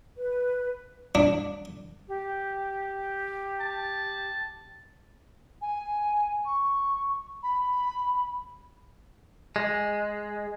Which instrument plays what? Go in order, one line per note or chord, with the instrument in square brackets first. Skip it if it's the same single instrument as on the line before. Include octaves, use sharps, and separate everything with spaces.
[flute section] B4
[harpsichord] D4
[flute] G4
[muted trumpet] A5
[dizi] G#5
C#6
B5
[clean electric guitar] G#3